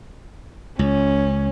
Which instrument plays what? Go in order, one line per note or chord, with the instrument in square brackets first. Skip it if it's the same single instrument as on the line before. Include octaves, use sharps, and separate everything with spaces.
[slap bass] C#2 [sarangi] C#4